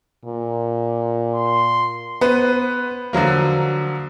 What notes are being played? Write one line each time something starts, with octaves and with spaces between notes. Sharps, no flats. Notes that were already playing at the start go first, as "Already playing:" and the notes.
A#2
C6
B3 B4 C5
D3 F3 F#3 A#3